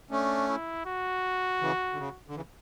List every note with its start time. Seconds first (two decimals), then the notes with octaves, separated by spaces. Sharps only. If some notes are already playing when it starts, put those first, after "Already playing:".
0.10 A3 C#4 D4
0.48 E4
0.86 F#4
1.61 C#3 E3
1.93 D3
1.98 C#3
2.28 D3
2.35 C#3 E3